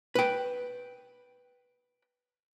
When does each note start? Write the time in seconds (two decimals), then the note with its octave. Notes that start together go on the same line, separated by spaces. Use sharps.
0.15 B4 G5